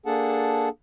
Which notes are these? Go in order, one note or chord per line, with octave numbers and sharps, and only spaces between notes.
A#3 D4 G#4 A4 F#5 A5